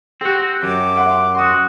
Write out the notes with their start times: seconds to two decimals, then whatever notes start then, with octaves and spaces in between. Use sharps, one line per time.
0.21 C4 F#4 G4
0.63 F#2 D6
0.95 E5 F#5 C6
1.35 F#4 C6 D#6